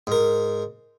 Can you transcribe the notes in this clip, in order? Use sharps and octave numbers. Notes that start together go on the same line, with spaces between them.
G#2 A#4